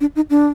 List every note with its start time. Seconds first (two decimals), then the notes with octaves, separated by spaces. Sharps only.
0.01 D4
0.16 D#4
0.30 D4